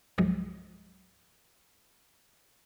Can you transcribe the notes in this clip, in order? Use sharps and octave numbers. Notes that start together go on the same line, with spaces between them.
C2 G2 F3 F#3 G#3